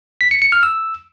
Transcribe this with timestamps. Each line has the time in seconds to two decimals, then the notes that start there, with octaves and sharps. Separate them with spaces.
0.21 B6
0.31 C#7
0.42 C#7
0.52 F6
0.63 E6